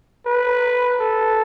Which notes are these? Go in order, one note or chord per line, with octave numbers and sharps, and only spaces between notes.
B4
A4